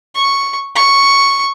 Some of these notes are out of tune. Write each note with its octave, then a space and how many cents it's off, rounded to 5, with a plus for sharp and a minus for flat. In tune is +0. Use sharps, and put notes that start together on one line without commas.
C#6 +0
C#6 +0